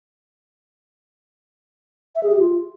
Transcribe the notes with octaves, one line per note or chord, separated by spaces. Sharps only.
E5
G#4
G4
F4